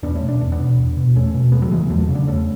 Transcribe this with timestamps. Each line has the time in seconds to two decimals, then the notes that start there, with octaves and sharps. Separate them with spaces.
0.03 E2 B3 D4
0.15 A3 C#4
0.22 B2
0.29 D4
0.41 E2
0.52 B3 D4
0.59 B2
0.78 E2
0.97 B2
1.15 E2 A3 C#4
1.34 B2
1.52 E2 G#3 B3
1.62 F#3 A3
1.71 C#3 E3 G#3
1.90 E2 F#3 A3
2.09 C#3
2.15 B3 D4
2.27 E2 A3 C#4